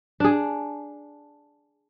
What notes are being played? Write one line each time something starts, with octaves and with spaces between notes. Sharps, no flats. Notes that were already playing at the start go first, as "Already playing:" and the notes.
D4 G#4